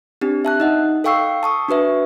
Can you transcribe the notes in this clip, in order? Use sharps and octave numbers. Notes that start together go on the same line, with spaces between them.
C4 D4 G4
E5 A5 F#6
D#4 D#5 F#5
A4 F5 G5 C#6 E6 C7
A5 C#6 D#6
D4 F#4 B4 E5